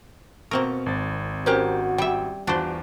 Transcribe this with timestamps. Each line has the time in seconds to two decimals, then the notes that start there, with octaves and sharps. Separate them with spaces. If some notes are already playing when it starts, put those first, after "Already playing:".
0.51 B2 A#3 C4 A#4 C#6
0.86 G#1 A6
1.46 C#4 F#4 G4 A#4 C5
1.98 G3 E5 G5
2.47 E2 D4 F4 F#4 C5 D7